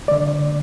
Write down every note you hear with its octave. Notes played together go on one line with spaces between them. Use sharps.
D5
D3